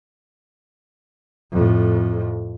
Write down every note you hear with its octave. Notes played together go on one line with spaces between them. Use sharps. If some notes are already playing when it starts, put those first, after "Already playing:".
F2 A2